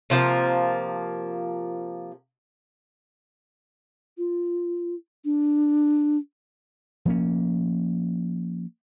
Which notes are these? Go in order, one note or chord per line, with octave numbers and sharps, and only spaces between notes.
C3 F3 A3 A#3
F4
D4
F3 A#3 C#4